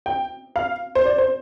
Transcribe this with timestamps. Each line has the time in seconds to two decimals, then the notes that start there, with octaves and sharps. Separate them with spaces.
0.06 G5
0.56 F5
0.95 C5
1.06 D5
1.18 C5